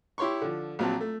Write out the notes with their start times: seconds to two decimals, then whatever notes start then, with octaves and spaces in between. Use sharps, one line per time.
0.18 E4 G4 C#5 C6 C#6
0.42 D3 F3
0.79 A#1 F#3 C4 A5
1.01 A3